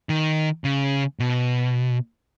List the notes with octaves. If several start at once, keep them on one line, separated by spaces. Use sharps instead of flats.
D#3
C#3
B2